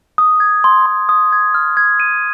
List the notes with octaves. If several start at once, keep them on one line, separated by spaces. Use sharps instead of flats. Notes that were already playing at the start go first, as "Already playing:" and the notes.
D#6
G#6
C6
C6
D#6
G#6
F6
G#6
D#7